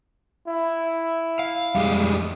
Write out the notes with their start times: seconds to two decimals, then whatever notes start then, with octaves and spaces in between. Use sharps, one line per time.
0.47 E4
1.39 F5
1.75 F2 G3 G#3